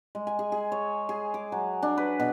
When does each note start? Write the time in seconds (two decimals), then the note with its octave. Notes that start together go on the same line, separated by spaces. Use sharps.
0.15 G#3
0.27 G#5
0.39 G#4
0.52 G#4
0.72 C#5
1.09 G#4
1.34 D6
1.52 F#3
1.83 D4
1.98 B4
2.20 B2